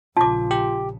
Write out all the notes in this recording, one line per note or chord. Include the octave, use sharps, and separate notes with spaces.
A#1 C#3 F4 A5 D6
G4